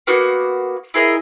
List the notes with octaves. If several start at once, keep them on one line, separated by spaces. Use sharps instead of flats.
A#3 B3 F#4
E4 G#4 A#4 D#5